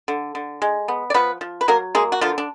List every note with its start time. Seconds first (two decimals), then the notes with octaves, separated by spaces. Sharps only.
0.08 D3
0.35 D3
0.62 G#3
0.88 B3
1.10 D5
1.14 F3 B3 B4
1.41 F3
1.61 B4
1.68 F#3 A#3 A#4
1.95 G#3 A#3 G#4
2.12 F#4
2.21 D3 F3 F4
2.38 D4